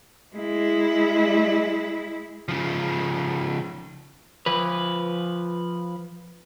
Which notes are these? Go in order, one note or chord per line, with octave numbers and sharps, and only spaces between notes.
G#3 E4
C#3 F3
F3 B4